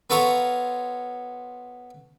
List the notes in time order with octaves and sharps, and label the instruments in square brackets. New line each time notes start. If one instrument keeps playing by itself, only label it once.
[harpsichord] B3 F4 A4 C#5 A#5